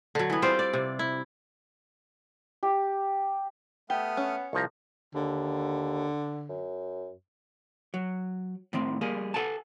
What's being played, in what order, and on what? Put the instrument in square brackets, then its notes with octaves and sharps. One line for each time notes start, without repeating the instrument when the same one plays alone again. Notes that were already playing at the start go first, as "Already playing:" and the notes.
[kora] D3 F#3
E3 B3
G3 C4 F4 C5
D5
C3
E4
[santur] G4
[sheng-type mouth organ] A3 D#6 F6 [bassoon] B3 [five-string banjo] G4
[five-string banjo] C#4
[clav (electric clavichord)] C2 F3 A#5 [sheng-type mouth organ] C#6
[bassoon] D#2 [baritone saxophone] D3
[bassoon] F#2
[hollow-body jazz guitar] F#3
A2 D#3 C4
G3 A#3 G#4
A4 F#5 G#5 A5